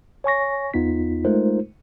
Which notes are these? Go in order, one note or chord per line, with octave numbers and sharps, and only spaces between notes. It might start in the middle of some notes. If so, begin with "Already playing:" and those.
C#5 G#5 C#6 A#6
E2 B3 D#4 F4 B6
G#3 A3 D#4 F4 A#4 C5